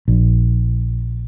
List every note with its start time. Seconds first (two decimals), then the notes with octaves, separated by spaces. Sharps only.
0.08 A#1